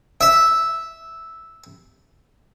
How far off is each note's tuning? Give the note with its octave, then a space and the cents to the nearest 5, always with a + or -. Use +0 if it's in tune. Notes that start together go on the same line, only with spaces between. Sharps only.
E5 -5